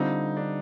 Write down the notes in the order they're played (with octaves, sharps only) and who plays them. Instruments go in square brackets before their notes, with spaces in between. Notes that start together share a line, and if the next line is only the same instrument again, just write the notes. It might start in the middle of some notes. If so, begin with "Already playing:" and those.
Already playing: [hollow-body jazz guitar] D3 G3 C4 F4 [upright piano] D#4
[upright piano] D4